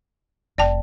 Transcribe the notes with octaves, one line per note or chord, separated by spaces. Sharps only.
F1 D5 G5 A5